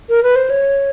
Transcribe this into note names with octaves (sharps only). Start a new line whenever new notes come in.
A#4
B4
C5
C#5